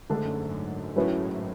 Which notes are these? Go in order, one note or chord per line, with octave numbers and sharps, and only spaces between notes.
G#2 D3 A3 D4 A4
F#2
F#2
A2 F#3 C#4 E4 B4